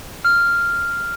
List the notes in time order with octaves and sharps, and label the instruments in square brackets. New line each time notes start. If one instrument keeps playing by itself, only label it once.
[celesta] F6